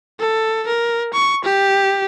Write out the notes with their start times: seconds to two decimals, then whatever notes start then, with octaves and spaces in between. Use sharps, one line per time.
0.20 A4
0.67 A#4
1.13 C#6
1.44 G4